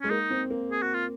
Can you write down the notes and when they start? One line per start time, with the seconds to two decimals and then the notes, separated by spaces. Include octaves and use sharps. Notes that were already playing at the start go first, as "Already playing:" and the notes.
0.01 G#3 C#4
0.10 A#3 D#4
0.31 C4
0.50 A#3
0.71 G#4
0.83 F#4
0.94 F4